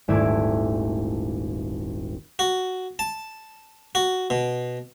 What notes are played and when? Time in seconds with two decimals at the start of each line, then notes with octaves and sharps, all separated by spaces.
0.08 D#1 G#1 A3 E4 D6 G#6
2.39 F#4
2.99 A5
3.95 F#4
4.30 B2